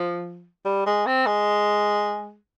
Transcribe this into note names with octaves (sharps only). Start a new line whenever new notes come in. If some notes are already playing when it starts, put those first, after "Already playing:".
Already playing: F3
G3
G#3
C4
G#3